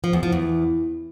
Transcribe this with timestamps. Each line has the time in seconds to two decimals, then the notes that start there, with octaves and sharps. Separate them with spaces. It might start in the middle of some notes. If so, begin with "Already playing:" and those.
0.04 F3
0.13 E2
0.23 F3
0.32 E2